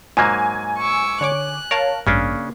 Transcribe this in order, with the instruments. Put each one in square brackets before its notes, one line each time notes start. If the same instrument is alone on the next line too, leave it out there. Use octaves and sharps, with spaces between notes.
[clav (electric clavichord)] G#2 F#3 A#3 [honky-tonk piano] G#5 G#6
[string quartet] C#6 D6 E6
[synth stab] D3 C#5 D6 [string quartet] F#6
[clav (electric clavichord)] A#4 [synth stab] C#5 F5 A5
[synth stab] A1 G2 [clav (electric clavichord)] C#3 C#4 D4 [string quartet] A#3